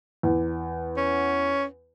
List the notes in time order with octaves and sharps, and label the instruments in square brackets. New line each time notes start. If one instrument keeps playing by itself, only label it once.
[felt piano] E2
[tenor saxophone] C#4